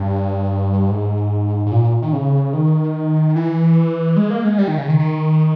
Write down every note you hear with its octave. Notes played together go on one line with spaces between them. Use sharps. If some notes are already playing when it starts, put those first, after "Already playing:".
Already playing: G2
G#2
G#2
A#2
D#3
C#3
D#3
E3
G#3
A#3
G#3
G3
D#3
C#3
D#3
D#3